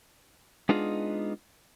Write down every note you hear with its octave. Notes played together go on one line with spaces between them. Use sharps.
G#3 B3 D4 D#4 F4 G#4